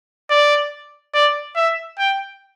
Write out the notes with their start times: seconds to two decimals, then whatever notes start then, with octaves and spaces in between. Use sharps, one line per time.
0.30 D5
1.14 D5
1.56 E5
1.98 G5